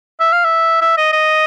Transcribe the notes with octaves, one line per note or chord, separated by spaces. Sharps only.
E5
F5
E5
E5
D#5
D#5